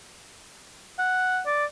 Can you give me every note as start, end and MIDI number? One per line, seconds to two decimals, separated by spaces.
0.99 1.40 78
1.46 1.65 74